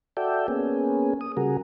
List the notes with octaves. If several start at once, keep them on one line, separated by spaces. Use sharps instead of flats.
F#4 A4 D5 E5 G5
A#3 B3 C#4 G#4
D#6
C#3 G3 F#4 G#4 A#4